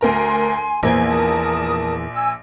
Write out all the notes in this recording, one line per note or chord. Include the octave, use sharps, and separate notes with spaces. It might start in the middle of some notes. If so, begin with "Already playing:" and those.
D2 A#4 G#5 A#5 C6
A#1 E2 A#3 C5 G#5
A#4 A5 D#6
G#5 E6